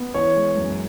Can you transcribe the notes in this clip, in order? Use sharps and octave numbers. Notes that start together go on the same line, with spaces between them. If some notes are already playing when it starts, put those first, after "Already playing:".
Already playing: B3
E3 C#5
G#3
F#2